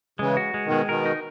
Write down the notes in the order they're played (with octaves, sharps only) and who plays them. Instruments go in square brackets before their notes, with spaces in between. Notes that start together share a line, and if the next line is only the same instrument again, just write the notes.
[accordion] C#3 E3 [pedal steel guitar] G#3
[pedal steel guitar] F#4
G#3
[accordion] B2 D#3
[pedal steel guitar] G#3
[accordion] B2 D#3 [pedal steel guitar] A#4
[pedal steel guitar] D#4